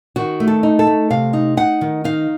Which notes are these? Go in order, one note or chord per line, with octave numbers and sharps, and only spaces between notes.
D#3 F#4
A3
A4
D#4
A4
A3
C3 F5
D#4
D#4 F#5
D#3
D#4 F5